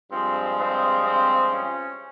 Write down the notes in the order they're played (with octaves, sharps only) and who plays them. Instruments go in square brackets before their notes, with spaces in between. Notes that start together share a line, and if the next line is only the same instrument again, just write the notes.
[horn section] G2 F3 G#3 C4
C4
C4
C#4